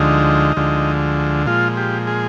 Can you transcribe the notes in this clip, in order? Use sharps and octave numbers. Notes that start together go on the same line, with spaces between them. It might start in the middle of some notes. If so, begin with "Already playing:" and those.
Already playing: D2 D3 F3 G#3 D#4
D2 D3 F3 G#3
A#2 F3 G#3 F4
G4
G#4